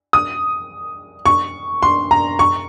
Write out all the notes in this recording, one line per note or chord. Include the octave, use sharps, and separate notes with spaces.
D#6
C#6
C6
A#5
C#6